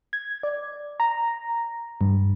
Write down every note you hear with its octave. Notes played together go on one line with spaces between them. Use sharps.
G#6
D5
A#5
G2